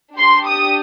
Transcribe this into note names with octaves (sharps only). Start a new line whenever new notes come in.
D4 G4 C6
D#6